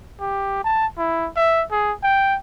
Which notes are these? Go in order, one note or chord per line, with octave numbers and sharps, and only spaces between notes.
G4
A5
E4
E5
G#4
G5